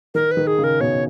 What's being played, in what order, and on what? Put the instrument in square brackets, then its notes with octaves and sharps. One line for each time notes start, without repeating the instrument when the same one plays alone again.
[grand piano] D#3 [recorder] A#4
[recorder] B4
[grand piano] D#3
[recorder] G#4
[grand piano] C#3
[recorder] A#4
[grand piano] B2 [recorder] C#5